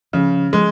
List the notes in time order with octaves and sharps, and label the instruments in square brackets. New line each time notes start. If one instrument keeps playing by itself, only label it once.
[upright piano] C#3 [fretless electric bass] F3
[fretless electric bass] F3 [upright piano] G#3